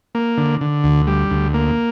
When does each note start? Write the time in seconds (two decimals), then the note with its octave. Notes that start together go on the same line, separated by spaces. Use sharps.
0.15 A#3
0.38 D3
0.61 D3
0.84 D2
1.07 G3
1.31 D2
1.54 A#3